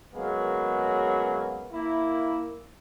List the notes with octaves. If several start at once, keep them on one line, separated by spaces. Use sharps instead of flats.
C#3 F#3 G#3 A#3 B3
A#3 E4